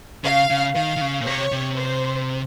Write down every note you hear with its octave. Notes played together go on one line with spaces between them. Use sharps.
C#3 F5
C#3
D#3 F5
D#3
C#3
A#2
C3 C#5
C3
C5